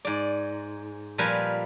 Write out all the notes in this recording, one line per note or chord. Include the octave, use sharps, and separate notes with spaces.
G#2 D5
A#2 F3 G3 A#4 B4 G#5